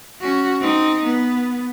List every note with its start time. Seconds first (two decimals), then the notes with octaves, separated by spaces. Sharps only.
0.22 C#4 F#4
0.61 C4 D#4
1.05 B3